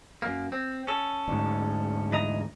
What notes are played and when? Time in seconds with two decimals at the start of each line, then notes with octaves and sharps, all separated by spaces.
0.22 F#2 A#3
0.52 C4
0.87 C#4 A4
1.28 D2 G#2
2.12 E3 D#5 A#5